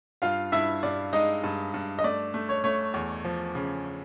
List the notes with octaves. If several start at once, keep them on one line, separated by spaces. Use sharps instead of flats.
G2 F4 F5
G2 E4 E5
G2 D5
G#3 D#4 D#5
G2
G2
D#5
A3 D5
A3
C#5
A3 C#5
E2
F3
C#3